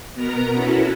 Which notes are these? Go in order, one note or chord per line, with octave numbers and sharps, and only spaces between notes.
B2 B3 A#4 A#5
C#4 E4 F#4 A4 B4